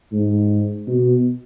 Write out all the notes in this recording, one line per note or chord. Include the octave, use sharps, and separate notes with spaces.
G#2
B2